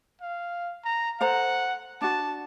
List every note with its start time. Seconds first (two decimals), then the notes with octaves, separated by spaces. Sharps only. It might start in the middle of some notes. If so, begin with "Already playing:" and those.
0.21 F5
0.85 A#5
1.21 A4 C5 F#5 A#5
2.01 D4 F#4 A5